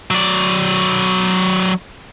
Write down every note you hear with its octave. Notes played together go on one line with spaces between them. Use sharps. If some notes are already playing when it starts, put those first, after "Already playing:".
F#3 D5